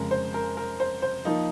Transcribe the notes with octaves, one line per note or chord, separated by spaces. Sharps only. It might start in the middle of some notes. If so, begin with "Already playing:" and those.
Already playing: F2 C#3 G#3 A#4
C5
A#4
A#4
C5
C5
F3 A#3 D#4